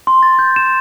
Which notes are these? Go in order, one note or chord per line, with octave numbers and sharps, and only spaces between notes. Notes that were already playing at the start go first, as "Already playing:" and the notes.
C6
A6
G6
E7